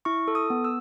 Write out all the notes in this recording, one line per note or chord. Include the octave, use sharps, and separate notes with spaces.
E4 C#6
A4
D#6
B3
E6